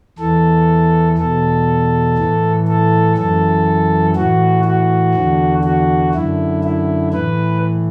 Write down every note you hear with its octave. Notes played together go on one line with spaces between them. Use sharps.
E2 E3 A4
E2 B2 A4
A2 E3
A4
F#2 E3 A4
A2 E3 F#4
F#4
E2 D3
F#4
F#2 D3 E4
E4
A2 E3 B4